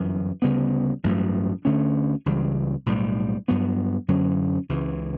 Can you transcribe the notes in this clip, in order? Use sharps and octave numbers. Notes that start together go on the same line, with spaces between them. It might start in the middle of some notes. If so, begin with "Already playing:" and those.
Already playing: G1 F#2 E3
D2 C#3 G3 B3
A1 G2 F#3 A3
D2 D3 A3 C#4
C#2 C#3 E3 G3
B1 A2 G3
G2 F#3 B3
F#2 D3 F#3 C#4
C#2 C#3 E3